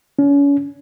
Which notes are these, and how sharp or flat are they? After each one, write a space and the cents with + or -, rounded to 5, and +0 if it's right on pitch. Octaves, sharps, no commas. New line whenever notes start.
C#4 +35